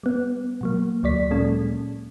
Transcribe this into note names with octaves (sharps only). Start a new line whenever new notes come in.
G3 B3
B2 F#3 A#3
D2 F#3 D5 B6
A#2 F#3 G#3 A#3 C#4 A4